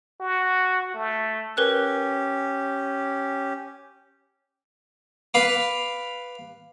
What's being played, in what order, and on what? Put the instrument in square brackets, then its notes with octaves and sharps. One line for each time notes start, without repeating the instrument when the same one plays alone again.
[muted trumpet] F#4
A3
[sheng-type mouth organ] C#4 G4 [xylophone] A#4 B4 F#6
[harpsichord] B4 F5 D6